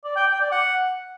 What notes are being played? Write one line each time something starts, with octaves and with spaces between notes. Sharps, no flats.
D5
G5
G5
D5
F#5